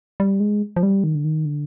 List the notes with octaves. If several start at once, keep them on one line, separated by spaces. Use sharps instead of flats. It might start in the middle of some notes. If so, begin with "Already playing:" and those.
G3
G#3
F3
G3
D#3
D3
D#3
D3